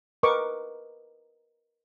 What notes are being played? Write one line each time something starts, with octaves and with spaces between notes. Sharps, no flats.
A#4 B4 D#5 C#6 D6